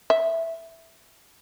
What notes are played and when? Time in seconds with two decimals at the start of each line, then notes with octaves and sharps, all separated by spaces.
0.10 E5